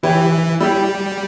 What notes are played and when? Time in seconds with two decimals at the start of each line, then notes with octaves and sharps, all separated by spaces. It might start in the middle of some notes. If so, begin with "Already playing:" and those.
0.03 E3 E4 G4 C#5
0.60 G3 E4 G4 C#5